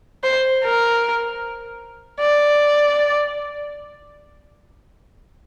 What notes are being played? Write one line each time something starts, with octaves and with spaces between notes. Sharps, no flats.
C5
A#4
D5